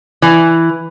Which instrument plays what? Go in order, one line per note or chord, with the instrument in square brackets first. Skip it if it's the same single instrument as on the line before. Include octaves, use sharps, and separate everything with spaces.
[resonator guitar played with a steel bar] E3